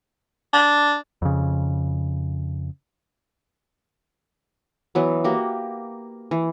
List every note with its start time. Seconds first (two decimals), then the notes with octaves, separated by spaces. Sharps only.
0.53 D4
1.22 F2 C#3
4.95 E3 F#3 B3
5.24 A#3 F#4 G4
6.31 E3